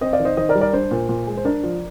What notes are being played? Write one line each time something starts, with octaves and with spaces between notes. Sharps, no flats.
C4 C5 D#5
D5 F5
D#3
C5 D#5
D#3 C5 D#5
A#4 D5
G3
A#4 D5
D4 C5
A#2
A#2
G#3
C5
D4 A#4 D5
F3